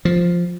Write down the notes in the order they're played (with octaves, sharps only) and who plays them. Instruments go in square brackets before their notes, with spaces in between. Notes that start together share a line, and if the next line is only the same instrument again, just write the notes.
[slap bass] F3